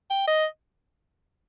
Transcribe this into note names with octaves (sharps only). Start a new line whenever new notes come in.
G5
D#5